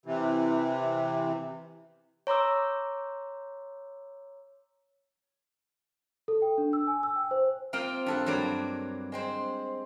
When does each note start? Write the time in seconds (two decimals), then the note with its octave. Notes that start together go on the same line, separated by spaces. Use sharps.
0.06 C3 E3
2.27 C#5 A#5 C6 D6 E6
6.28 A4
6.42 G5
6.58 D4
6.73 E6
6.87 G#5
7.03 E6
7.16 G5
7.31 C5
7.73 A#3 C4 F4 F5 G5
8.06 G2 A4 F#5
8.26 G2 F#3 A#3 D5
9.12 G#3 C4 C5